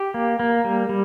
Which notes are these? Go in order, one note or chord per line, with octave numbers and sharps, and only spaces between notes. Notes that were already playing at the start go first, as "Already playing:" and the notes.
Already playing: G4
A#3
A#3
G3
G3